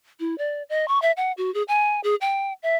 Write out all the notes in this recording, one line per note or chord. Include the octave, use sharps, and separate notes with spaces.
E4
D5
D#5
C#6
E5
F#5
F#4
G#4
G#5
G#4
G5
E5